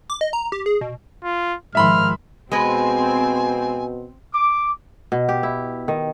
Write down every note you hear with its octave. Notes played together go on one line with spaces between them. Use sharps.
D6
D#5
A#5
G4
G#4
B2
F4
G#2 D#3 F3 E5 B5 C6 F6
B2 G#3 C4 B4 G#5
D6
B2
G4
E4
D#3